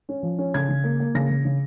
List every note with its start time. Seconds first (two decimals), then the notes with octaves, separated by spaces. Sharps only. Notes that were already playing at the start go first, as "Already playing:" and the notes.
0.09 C#4
0.23 F3
0.38 C#4
0.54 C#3 G#6
0.69 C#3
0.84 A#3
1.00 A#3
1.15 C#3 A#6
1.30 C#3
1.45 C#3